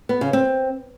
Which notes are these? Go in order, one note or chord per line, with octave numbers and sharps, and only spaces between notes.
B3
C#3
C4